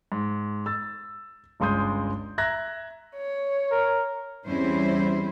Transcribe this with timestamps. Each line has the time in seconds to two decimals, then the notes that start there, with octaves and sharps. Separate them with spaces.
0.12 G#2
0.66 E6 A6
1.60 G1 C#2 G#3 C6 D#6 G6
2.38 E5 A#5 F#6 G#6 A#6
3.17 C#5
3.71 A#4
4.47 E2 G3 C4 C#4 E4 C5